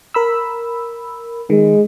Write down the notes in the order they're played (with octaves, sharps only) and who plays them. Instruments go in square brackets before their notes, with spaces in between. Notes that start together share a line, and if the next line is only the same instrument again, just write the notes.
[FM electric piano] A#4 B5 E6
[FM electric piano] D#3 [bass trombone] G#3